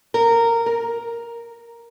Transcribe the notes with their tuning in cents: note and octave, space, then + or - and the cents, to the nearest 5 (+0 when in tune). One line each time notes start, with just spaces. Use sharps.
A#4 -15
A#4 +5